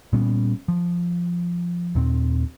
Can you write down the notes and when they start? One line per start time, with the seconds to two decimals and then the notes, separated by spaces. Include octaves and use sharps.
0.13 A#2 G3 B3 C#4
0.68 F3
1.95 D#2 A#2 C4